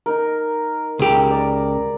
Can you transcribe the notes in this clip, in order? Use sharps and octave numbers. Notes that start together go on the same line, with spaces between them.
D#4 A#4
C#2 G4
A#4 D5